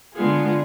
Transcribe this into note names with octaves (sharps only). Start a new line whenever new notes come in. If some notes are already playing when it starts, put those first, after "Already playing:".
D3 G#3 B3 F4 G#4